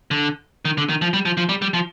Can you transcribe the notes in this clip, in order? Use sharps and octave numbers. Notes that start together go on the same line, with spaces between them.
D3
D#3
D3
D#3
F3
G3
F3
F3
G3
G3
F3